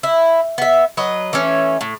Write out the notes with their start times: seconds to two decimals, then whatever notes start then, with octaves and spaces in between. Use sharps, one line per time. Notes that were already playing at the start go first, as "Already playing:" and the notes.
0.03 E4
0.58 B3 E5
0.97 F#3 B4 D#5
1.33 E3 A3 C#4
1.81 A2